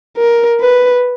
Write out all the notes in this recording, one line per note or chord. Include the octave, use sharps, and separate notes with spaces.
A#4
B4